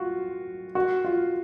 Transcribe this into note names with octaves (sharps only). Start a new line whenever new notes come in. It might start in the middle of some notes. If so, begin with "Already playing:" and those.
Already playing: F4 F#4
F#4
F4